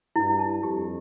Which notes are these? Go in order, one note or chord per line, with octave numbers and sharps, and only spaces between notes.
G2 E4
A5
F2 G4